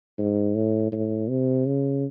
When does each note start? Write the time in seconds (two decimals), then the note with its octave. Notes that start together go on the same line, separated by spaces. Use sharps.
0.18 G#2
0.55 A2
0.92 A2
1.29 C3
1.66 C#3